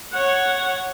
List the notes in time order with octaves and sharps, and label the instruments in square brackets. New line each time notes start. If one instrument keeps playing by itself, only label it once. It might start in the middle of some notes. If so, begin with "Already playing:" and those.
[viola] C#5 F#5